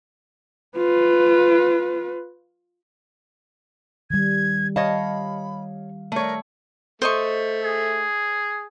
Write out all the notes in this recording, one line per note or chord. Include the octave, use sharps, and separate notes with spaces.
F4 B4
D#3 G3 G#6
C#5 D#5 F5 A5 B5
A3 A#4 C#5
A3 C5 D#5 C#6
G#4